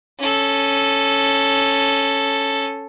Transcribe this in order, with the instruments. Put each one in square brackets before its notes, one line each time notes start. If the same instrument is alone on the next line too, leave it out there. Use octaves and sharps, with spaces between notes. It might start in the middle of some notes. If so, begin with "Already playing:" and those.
[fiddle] C#4 A4